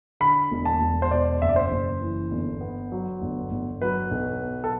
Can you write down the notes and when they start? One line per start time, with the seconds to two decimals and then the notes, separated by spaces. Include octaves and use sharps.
0.20 D3 B5
0.51 E1
0.65 A5
0.81 E1
1.02 C5
1.11 B2 D5
1.42 F#1 E5
1.49 D5
1.56 C5
1.71 F#1
2.01 E3
2.31 G1
2.61 B3
2.92 F#3
3.22 G1
3.52 G1
3.81 F#3 B4
4.11 B1
4.41 B3
4.64 A4